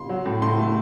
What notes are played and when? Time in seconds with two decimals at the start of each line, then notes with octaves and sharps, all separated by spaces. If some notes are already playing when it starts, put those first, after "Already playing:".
Already playing: C6
0.09 F#3
0.26 A2
0.42 A2 C6
0.58 A3